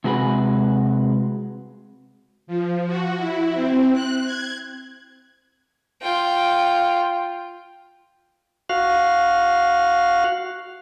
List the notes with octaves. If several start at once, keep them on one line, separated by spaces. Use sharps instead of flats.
C3 G#3 F#4 G#4 B4
F3
F#4
E4
C4
F#6
G#6
F4 G5
F#4 F5